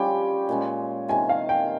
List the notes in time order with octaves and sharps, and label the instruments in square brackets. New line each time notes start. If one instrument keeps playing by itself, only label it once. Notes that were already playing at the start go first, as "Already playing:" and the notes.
Already playing: [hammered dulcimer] G3 C#4 F4 G4 [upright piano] G5
[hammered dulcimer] A#2 G#3 C#4
[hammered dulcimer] C3 D#3 A#3 [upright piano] G#5
[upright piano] F5
G5